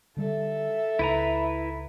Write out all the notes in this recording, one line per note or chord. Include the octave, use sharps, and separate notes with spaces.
D3 G3 A4 E5
C#2 E4 B4 A#5